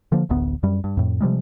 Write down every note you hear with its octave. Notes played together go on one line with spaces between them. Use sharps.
D3 F3 A#3
D1 A1 D2 B3
F#2 G3
G2
F2 A2
C3 F3 G3 G#3